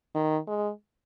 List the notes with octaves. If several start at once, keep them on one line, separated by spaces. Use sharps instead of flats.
D#3
G#3